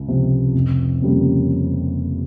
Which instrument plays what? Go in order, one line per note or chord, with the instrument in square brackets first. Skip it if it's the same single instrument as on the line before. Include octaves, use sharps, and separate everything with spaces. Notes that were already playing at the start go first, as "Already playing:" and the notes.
Already playing: [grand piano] C#2
C3 F3
F1
F2 C#3 G3 A#3